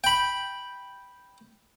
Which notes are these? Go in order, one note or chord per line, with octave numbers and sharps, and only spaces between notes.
G5 B5